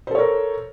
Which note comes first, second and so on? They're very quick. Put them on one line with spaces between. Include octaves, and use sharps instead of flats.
C5 A4 C#5 A#4